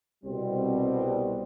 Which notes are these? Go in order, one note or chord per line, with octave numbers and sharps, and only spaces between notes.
C2 B2 G3 C4